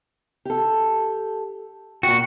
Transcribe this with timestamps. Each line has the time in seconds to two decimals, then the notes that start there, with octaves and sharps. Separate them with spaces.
0.45 G4 A4
2.03 A#2 F#4 G5